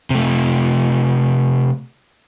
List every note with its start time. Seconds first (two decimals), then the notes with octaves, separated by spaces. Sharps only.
0.10 C3 A3